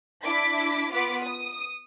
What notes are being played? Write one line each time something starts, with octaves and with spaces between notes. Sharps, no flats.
D4 E4 D6 B6
B3 F4 B4 D6 B6
D#6